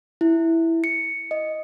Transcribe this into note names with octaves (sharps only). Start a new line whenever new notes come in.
E4
C#7
D#5